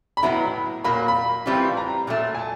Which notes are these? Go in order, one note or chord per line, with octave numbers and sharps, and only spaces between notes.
B5
A2 F#3 B3 E4 A#5
A#2 F#3 A#3 B5
B5
A2 E3 G3 C4 F4
A#5
A#2 F#3 A3
G#5
A5